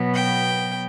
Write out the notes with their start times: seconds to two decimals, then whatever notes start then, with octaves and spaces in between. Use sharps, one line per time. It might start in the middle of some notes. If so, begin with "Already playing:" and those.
Already playing: B2 F#3 B3
0.15 G5